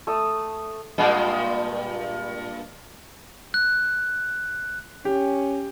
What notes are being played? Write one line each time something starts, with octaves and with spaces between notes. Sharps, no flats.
A3 D#6
G2 A#2 G#3
F#6
C#4 G4